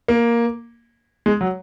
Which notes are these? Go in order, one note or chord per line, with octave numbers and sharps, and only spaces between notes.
A#3
G#3
F#3